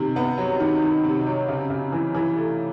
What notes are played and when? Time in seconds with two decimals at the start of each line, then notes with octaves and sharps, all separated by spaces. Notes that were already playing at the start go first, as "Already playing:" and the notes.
Already playing: C3 D#3
0.16 B3
0.38 F#3
0.60 D#3
0.83 D#3
1.04 C3
1.27 F#3
1.48 C#3
1.70 C#3
1.92 E3
2.15 E3
2.36 A3